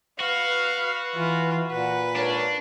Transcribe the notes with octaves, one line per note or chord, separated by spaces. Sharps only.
F#4 B4 F5
E3 F4
A#2 B4 F#5
G#2 D4 A#4 C#5